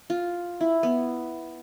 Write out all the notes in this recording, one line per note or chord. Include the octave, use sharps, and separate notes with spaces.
F4
E4
B3